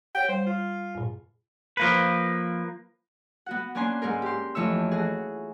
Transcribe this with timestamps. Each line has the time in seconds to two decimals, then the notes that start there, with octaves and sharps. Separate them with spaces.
0.15 C#5 F#5 G5
0.29 G3 C5
0.46 F4
0.95 G2 A#2
1.77 F3 A#3 B4
3.46 B3 F#4 F#5
3.75 A#3 C#4 D4 G#5 C6
4.02 G#2 G#4 A#4
4.22 G4 C6
4.55 F2 E3 A3 C#5 E6
4.91 F#4 G#4